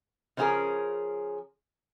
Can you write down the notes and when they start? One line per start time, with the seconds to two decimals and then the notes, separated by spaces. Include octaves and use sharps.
0.37 C#3 F3 C#4 F4 G#4 A#4